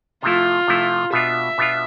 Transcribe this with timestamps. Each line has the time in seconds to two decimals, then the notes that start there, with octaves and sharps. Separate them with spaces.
0.23 C3 F3 A3 E4 F4
0.68 C3 F3 A3 E4
1.13 B2 B3 D4 F4 E5
1.58 B2 B3 D4 F4